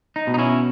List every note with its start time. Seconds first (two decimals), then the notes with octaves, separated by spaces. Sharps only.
0.16 D#4
0.27 B2
0.34 D#4
0.38 C#4 E4